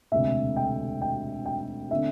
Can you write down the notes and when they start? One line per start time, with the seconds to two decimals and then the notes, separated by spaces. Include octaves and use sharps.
0.12 E1 D2 C3 E5
0.56 G5
1.02 G5
1.46 G5
1.91 D3 A3 C4 E5